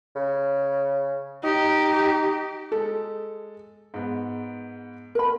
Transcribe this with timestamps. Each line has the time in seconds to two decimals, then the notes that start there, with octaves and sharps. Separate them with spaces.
0.15 C#3
1.44 D#4 G4
2.72 G#3 A4
3.94 G#2 B3
5.15 A#4 B5